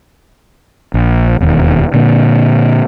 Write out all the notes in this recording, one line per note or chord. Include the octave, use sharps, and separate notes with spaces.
A#1
E1 D#2
A#2 D3